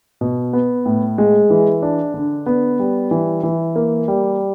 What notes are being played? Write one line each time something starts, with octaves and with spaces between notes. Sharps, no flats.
B2
B3
A2
G#3
E3
D4
D3
B3
G3
E3
E3
A#3
G3